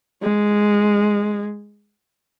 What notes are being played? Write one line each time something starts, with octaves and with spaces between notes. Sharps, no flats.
G#3